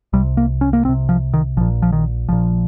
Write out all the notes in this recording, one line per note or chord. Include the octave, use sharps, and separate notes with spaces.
C2 C3 G3
A#3
C#4
A#3
C2 C3 C4
F3
D#3
A#1 A#2 F3
F3
D#3
A#1 A#2 F3